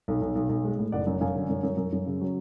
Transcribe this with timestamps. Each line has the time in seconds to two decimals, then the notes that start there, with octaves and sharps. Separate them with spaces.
0.08 B1
0.21 B1
0.36 B1
0.49 B1
0.64 G#3
0.78 A2
0.92 F#1 D5 F#5
1.07 F#2
1.21 F#2 F5 G#5
1.36 D3
1.49 F#2
1.63 F#2
1.77 F#2
1.93 F#2
2.06 C#3
2.21 F#3